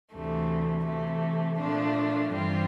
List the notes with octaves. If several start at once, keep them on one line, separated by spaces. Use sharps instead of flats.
D2 C3 E3 A3
C3 E3 A3
A#2 F3 A3 D4 F4
G2 E3 G3 C4 F4